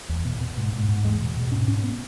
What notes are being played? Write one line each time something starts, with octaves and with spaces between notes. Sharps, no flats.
E2
B2
B2
G#2
G#2
G#2
E2 G#3
B2
B2
G#2 C#4
G#2 C#4
B3